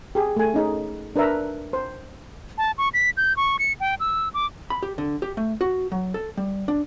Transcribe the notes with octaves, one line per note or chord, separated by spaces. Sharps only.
G4 G#4
A3 G#5
C#4 D#4 G#4
D4 A#4 B4 E5 A#5
C5
A5
C#6
B6
G6
C#6
C#7
G5
E6
D6
B5
G4
D3
G4
A3
F#4
F#3
A4
G3
D4